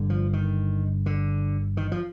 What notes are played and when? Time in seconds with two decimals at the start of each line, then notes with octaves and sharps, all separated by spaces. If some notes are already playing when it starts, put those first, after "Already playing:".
Already playing: G1 G2 D3
0.10 F3
0.33 D#3
1.06 D3
1.77 D#3
1.92 F3